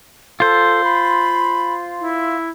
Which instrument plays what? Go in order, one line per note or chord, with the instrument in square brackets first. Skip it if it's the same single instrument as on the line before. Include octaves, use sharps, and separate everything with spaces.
[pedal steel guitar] F4 C5 [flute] A4
[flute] B5
E4